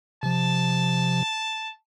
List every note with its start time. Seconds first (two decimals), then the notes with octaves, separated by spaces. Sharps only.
0.23 C3 F3 A5